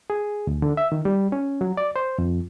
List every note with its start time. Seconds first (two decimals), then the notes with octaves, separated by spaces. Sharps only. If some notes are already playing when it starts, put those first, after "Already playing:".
0.10 G#4
0.47 D2
0.62 D3
0.77 E5
0.92 D#3
1.05 G3
1.32 C#4
1.61 F#3
1.77 D5
1.96 C5
2.18 F2